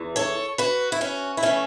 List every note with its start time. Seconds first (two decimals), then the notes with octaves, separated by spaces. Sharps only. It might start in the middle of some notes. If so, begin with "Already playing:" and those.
Already playing: E2 E3
0.16 A4 C#5
0.58 F#4 B4
0.92 E4
1.01 C#4 F#4
1.37 E4
1.43 E3 A3 C#4